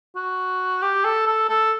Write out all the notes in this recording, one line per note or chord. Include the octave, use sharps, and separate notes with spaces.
F#4
G4
A4
A4
A4